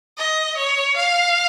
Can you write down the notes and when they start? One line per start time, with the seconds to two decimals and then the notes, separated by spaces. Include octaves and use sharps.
0.17 D#5
0.57 C#5
0.96 F5